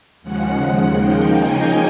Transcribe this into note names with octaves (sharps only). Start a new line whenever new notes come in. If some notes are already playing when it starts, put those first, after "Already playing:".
D#2 C#3 F3 G#3 F#5
C#3 F3 A#3 D#4 G5
G#5